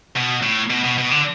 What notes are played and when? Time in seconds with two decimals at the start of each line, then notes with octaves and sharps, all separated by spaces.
0.16 B2
0.43 A2
0.70 B2
0.84 B2
0.98 B2
1.11 D3